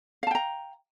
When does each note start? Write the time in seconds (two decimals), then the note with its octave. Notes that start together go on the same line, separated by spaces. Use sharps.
0.23 F5
0.27 A5
0.31 G5
0.35 A#5